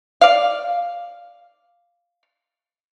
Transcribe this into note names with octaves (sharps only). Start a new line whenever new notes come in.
D5 F5